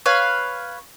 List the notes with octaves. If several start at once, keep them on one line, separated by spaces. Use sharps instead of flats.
B4 C#5 F5